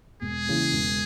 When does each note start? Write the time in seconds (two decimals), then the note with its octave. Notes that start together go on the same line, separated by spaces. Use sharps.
0.21 E1 G#4
0.46 D#2 C#3 E3
0.72 E1